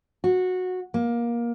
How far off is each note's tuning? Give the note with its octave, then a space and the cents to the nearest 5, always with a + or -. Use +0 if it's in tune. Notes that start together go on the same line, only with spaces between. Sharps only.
F#4 -15
A#3 +20